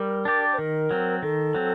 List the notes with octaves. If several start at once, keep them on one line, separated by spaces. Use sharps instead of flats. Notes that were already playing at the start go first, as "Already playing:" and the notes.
Already playing: G3 A#4
D4 G4 D5
C5
D#3 A#4
F#3 C4
D#3 A4
F#3 C4